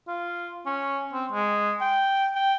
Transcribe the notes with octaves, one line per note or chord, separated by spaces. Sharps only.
F4
C#4
C4
G#3
G5
G5